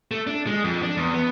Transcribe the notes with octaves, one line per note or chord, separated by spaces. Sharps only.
A3
D4
G#3
F2
D4
E2
B3